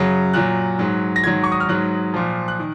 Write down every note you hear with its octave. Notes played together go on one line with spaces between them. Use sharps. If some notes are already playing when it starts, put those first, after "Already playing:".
Already playing: F#2 C#3 F#3
A#2 F#3 F#6
G#2 F#3
A#6
G#2 D#3 F#3 G#6
C#6
D#6
F6
G#2 F#3 F#6
A#2 F3
F#6
D#3